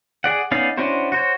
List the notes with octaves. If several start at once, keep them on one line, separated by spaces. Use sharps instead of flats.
G#4 D5 F#5
B3 C#4 D#4 D5 F5
C#4 D4 E4 F#4 C5
F#4 C5 C#5